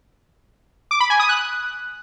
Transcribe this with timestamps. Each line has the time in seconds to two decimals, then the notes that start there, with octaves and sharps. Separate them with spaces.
0.91 D6
1.00 B5
1.10 G#5
1.19 D#6
1.29 F#6